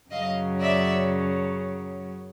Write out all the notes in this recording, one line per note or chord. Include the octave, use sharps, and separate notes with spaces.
F#2 C#3 F#3 D#5 F5
D5 E5